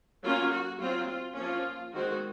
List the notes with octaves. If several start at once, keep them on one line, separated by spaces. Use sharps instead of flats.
F#3 A#3 C#4 F4
F#4
F#3 C4 F4
F4
F3 A#3 C#4 F4
D#3 G#3 C4 F#4